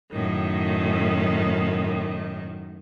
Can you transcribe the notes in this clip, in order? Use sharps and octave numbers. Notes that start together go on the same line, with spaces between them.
F#2 A2 D#3